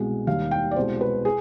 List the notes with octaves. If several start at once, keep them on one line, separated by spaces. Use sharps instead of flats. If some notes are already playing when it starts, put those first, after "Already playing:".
Already playing: C2 B2 G#3
D#2 D#3 G3 F5
G5
D5
C2 B2 G#3 C5
B4
G#4